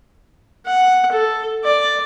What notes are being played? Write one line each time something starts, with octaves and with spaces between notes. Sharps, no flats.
F#5
A4
D5